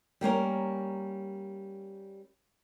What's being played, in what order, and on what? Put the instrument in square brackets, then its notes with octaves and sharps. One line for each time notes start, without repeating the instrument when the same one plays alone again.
[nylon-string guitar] G3 A#3 C#4 A#4